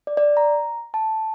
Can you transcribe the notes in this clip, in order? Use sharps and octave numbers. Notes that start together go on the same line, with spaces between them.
D5
D5
A#5
A5